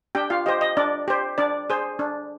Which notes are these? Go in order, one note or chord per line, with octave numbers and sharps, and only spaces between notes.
D4 G4 G5
F4 F5
G4 C5 D#5
D#5
D4 D5
G4 C5
D4 D5
G#4 C5
D4